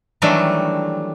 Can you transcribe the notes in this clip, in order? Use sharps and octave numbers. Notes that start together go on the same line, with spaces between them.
D#3 E3 F#3 G3 A3 D4